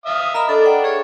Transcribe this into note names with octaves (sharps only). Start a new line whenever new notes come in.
E5 F5 D#6
A#4 D#5 E5 B5
D4 A4
F#5 G5
G#4 C#5